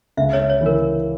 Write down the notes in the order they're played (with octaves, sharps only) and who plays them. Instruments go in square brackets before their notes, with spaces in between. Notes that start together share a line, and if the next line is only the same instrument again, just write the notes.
[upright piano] C#2 [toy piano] E5
[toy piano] C#5
[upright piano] C#2
[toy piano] C#5
[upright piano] E3 [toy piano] A#4